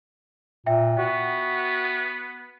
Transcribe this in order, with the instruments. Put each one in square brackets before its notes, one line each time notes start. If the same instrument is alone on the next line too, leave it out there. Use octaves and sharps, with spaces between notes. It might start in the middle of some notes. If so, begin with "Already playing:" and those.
[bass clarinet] A#2 [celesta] E5 G5
[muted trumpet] B3 [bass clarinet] F#4